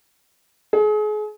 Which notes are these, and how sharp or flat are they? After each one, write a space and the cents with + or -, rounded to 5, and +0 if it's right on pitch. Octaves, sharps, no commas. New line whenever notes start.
G#4 +35